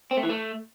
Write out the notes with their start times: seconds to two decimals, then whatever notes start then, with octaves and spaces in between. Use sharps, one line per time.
0.11 C4
0.17 A3
0.23 E3
0.29 A3